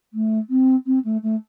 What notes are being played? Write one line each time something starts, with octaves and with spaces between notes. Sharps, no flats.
A3
C4
C4
A3
A3